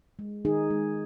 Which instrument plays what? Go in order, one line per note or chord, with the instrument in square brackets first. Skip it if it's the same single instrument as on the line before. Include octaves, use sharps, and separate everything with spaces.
[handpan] G#3
D#3 D#4 G#4
G#3